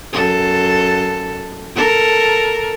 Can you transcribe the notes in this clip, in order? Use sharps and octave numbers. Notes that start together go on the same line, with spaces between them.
F#2 A4
A4 A#4